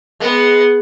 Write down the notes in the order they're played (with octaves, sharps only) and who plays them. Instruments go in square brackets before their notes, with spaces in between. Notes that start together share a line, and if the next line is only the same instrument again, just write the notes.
[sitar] G#3 [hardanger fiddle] B3 F#5